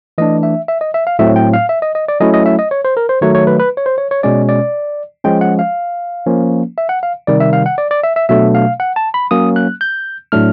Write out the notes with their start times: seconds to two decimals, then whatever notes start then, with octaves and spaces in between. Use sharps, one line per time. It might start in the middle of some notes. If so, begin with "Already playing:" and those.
0.18 E3 A3 D4 D#5
0.43 E5
0.68 E5
0.81 D#5
0.94 E5
1.07 F5
1.19 A2 F#3 A3 C4 E5
1.36 G5
1.54 F5
1.69 E5
1.82 D#5
1.95 D#5
2.08 D5
2.20 F#3 A3 C#4 E4 D#5
2.34 D#5
2.46 E5
2.59 D#5
2.71 C#5
2.85 C5
2.97 A#4
3.09 C5
3.21 D#3 F#3 A3 C#5
3.35 C#5
3.47 B4
3.59 B4
3.77 C#5
3.86 C5
3.98 C#5
4.11 C#5
4.23 B2 G#3 C#4 D5
4.49 D5
5.24 F3 G#3 C#4 G5
5.41 F#5
5.59 F5
6.26 F3 A#3 C#4
6.78 E5
6.89 F#5
7.03 F5
7.27 C3 D#3 G3 D5
7.40 E5
7.53 F5
7.66 F#5
7.78 D5
7.91 D5
8.04 E5
8.16 E5
8.29 B2 F#3 A3 D4 E5
8.55 F5
8.80 F#5
8.96 A5
9.14 B5
9.31 F#3 A#3 C#4 D#6
9.56 F#6
9.81 G6
10.32 A2 F#3 A3 D4 F6